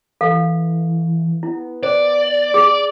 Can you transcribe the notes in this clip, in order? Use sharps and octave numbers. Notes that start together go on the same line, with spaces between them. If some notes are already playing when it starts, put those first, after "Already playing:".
E3 A4 F5
B3 E4
C5 D5
G#4